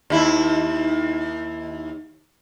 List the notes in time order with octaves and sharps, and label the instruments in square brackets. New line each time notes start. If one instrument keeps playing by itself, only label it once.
[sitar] D#2 E4